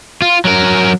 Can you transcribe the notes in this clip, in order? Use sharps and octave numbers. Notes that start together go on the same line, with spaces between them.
F4
F#3 A#4